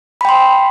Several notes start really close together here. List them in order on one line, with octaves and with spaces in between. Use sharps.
B5 G5 C6